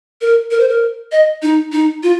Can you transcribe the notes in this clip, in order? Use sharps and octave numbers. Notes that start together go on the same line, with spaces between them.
A#4
A#4
C5
A#4
D#5
D#4
D#4
F4